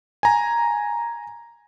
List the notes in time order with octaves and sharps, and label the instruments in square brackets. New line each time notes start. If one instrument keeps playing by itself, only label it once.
[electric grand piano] G#5 A#5